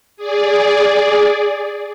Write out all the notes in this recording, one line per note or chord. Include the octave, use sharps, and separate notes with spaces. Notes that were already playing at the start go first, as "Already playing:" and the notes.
G#4 D5